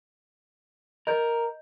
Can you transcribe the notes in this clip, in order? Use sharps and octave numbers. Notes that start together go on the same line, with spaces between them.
A#4 D#5 G6